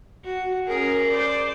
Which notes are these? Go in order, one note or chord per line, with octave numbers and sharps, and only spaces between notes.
F#4
C#4 G#4 A#4
C5 D5